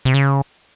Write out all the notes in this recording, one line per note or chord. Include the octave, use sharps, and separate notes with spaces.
C3
C#3